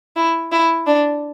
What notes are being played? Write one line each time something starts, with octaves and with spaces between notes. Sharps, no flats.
E4
E4
D4